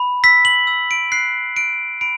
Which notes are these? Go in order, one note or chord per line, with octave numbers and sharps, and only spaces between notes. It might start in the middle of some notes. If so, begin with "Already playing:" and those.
Already playing: B5
E6 B6
F#7
E6
D7
F#6 C7
F#6 D7
B5 D7